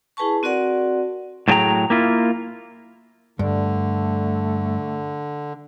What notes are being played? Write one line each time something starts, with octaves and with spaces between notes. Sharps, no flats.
E4 G#4 B4 G#5 A5 C#6
C4 F#4 A#4 D5 F#5
A2 F#3 D4 G#4 G5 A#5
A#3 E4 F4
G2 D3 A3